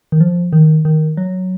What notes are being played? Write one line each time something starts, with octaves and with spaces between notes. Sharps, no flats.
D#3
F3
D#3
D#3
F#3